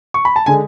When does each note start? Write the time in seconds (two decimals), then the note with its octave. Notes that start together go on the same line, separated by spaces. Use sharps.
0.14 C#6
0.25 B5
0.36 A5
0.46 D3 G#3 G#5